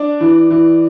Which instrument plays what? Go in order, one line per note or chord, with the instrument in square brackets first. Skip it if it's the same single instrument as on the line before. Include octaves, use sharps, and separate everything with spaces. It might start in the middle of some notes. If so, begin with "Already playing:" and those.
Already playing: [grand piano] D4 D5
E3
E3